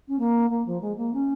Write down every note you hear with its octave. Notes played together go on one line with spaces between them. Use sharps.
C#4
A#3
A#3
F3
G#3
A#3
C#4